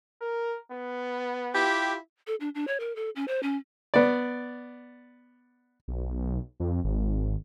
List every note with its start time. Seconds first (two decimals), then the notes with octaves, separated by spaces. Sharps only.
0.21 A#4
0.72 B3
1.55 E4 F4 G4
2.27 A4
2.40 D4
2.55 D4
2.67 C#5
2.80 A#4
2.96 A4
3.16 C#4
3.28 C5
3.43 C#4
3.94 B3 D5
5.88 B1
6.60 F2
6.84 G#1